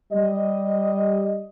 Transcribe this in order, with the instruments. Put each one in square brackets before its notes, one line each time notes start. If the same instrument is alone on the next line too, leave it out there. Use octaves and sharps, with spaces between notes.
[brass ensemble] G3 D#5